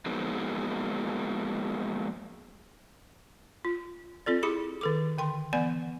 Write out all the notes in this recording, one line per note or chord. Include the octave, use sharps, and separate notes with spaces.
F3 F#3 G#3 A#3 B3 D#4
F4
C4 F4 A4 D5
E4 G4 G#4 B5 D6
D#3 A4 D6
D3 G5 C6
E3 B3 D5 G#5